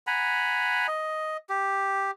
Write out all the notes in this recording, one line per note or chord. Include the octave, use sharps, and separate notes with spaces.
F#5 G#5 A#5 B5
D#5
G4